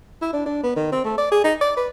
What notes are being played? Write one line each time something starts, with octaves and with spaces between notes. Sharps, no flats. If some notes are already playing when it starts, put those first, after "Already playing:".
E4
D4
D4
B3
D#3
C4
A3
D5
G#4
D#4
D5
B4